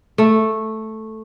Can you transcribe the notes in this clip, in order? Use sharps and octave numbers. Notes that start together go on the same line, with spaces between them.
A3